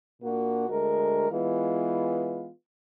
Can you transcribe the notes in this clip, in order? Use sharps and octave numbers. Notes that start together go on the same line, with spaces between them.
A#2 A#3 D4 F#4
D2 G#3 A#4
E3 G#3 B3 F4